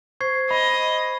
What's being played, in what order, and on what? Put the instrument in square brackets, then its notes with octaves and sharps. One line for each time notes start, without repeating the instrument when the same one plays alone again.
[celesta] C5 [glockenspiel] C#6 G#6 C7
[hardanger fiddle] D#5 [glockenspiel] B5